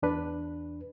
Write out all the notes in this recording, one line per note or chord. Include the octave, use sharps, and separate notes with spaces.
E2 D4 B4